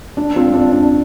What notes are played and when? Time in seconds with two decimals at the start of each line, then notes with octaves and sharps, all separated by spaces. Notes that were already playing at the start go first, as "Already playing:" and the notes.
0.17 D4
0.36 C4 F4
0.54 D4
0.72 D4